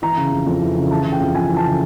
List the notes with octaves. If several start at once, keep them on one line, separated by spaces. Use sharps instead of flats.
E3 A#5
C#3
F2
F2
E3
C#3
E3 A5
C#3
G5
F2
F2 G#5
E3
A5
C#3